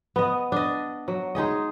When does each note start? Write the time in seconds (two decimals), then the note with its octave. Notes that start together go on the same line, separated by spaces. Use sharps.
0.16 B3 D#5
0.52 D4 D#5
1.08 F#3
1.35 G#3 D#4 G#4 D#5